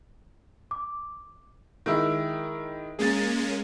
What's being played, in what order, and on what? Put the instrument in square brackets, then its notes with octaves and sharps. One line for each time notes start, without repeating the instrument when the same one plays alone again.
[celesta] D6
[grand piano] D#3 G#3 E4
[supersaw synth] G#3 A#3 C#4 [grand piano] G#4 A6